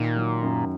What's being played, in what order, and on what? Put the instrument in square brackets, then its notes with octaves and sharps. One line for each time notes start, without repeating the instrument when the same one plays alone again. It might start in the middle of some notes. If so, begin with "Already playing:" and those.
Already playing: [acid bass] A#2 [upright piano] D#3
[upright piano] F#3
F#2